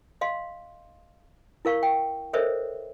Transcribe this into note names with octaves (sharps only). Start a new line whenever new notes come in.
D#5 F5 C6
E4 A#4 F5 C#6
G5
A4 A#4 C5 C#5 D#5 E5